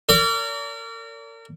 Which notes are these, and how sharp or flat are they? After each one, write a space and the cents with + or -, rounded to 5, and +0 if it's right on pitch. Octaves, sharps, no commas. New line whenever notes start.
A#4 -35 D5 -40